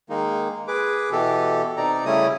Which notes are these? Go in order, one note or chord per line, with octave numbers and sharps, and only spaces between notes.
D#3 G#3 A#3 D#4
G#4 B4 D6
B2 E3 G4 A4
C3 D#4 D5 A#5
C#3 G3 A3 C#4 E4 D#6